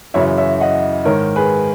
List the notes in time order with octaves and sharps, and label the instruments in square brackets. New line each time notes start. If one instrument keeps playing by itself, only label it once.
[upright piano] F#2 C#3 E3 C#5 E5
C#5 E5
D#5 F#5
G#2 D#3 A#4 C#5
G#4 B4